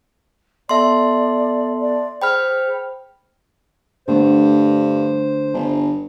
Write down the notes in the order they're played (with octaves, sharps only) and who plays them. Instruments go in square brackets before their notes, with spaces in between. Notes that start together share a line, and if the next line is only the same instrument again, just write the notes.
[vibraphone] B3 A4 A5 [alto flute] D5 [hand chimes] E5 C6
[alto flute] D5
[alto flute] G#4 [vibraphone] C5 [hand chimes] G5 B5 F6
[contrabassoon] G2 [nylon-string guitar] D3 A3 B3 [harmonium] C5
[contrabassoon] G1